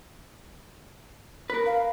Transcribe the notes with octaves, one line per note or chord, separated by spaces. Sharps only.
A#4 B4
F5